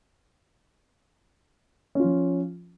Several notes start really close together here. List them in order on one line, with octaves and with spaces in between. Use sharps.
C#4 F4 F3